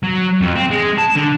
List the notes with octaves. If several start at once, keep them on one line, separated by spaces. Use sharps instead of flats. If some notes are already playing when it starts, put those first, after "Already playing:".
F#3
F2
C4
G#3
A5
D3